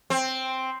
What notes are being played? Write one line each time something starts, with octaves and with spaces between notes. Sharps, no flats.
C4